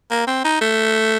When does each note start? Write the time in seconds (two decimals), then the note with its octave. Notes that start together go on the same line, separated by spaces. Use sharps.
0.11 A#3
0.27 C4
0.44 D#4
0.61 A3